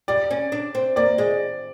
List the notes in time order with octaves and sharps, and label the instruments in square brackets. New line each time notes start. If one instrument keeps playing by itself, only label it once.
[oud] G3 [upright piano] D5
[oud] C#4
D4
C4
[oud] A#3 [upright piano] D5
[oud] G#3